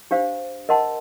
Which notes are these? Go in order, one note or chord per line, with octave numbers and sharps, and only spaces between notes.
D4 G4 C5 F5
A#4 D#5 F#5 A5 C6